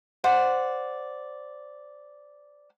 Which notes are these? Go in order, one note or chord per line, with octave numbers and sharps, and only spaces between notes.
C5 D5 F#5